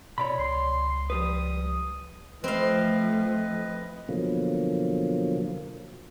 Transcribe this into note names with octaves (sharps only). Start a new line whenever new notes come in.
B2 C#5 D5 B5
C#2 C6
F3 G3 B4 D#6
F3 A3 C4 B4 D#5 F5
B2 D3 F3 F#3 A#3